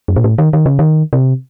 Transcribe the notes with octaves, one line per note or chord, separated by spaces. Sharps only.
F#2
A#2
A2
D#3
D#3
C#3
D#3
C3